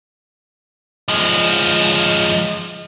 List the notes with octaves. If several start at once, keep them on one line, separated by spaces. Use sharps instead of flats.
F3 G#3